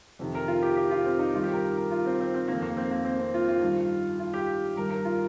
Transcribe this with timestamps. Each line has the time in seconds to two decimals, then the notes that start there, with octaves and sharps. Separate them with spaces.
0.19 F2 C3 D#3
0.35 A#4
0.48 F4
0.62 G4
0.77 G4
0.91 F4
1.05 C4
1.19 D#4
1.34 G2 D#3 F4
1.44 G4
1.53 A#4
1.77 A#4
1.91 F4
2.06 C4
2.20 C4
2.34 C4
2.48 F2 D#3 A#3
2.62 A#3
2.77 C4
2.91 A#3
3.05 C4
3.19 C4
3.34 F4
3.49 F4
3.62 G2 D#3
4.19 F4
4.34 G4
4.76 G2 D#3 A#4
4.90 A#4
5.05 F4